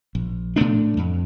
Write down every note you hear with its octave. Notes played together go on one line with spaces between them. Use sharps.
A#1
A2 A3 D4
F2